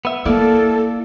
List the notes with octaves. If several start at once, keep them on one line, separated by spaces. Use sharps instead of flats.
B3 E5
A#3 E4 A4 D5 F5